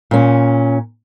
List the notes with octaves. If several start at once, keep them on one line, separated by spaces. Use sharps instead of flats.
A#2 C#4